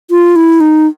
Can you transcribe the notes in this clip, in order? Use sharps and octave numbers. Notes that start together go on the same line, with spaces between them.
F4
E4
D#4